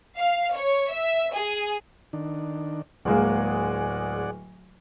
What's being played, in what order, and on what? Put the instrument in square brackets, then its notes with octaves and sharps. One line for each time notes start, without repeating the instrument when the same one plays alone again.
[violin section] F5
C#5
E5
G#4
[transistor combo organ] D#3 D4
[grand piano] D1 G#3 A#3 [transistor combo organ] G#4 D5 F#5